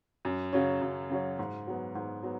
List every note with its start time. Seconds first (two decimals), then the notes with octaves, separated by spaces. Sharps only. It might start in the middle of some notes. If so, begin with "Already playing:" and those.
0.25 F#2
0.53 C#3 F#3 C#4
0.81 F#2
1.10 C#3 F#3 C#4
1.39 G#2
1.67 F#3 B3
1.95 G#2
2.23 F#3 B3